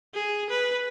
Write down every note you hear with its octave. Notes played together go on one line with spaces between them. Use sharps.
G#4
B4